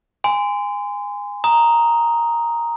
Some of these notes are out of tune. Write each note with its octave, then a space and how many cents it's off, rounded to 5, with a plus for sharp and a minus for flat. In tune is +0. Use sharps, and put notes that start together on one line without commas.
G#5 -20 C6 -30
A#5 +0 D#6 +5